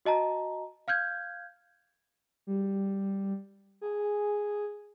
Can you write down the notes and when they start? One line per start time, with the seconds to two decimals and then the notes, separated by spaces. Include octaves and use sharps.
0.05 F#4 D#5 A5 A#5
0.88 F5 F6 G6 G#6
2.47 G3
3.81 G#4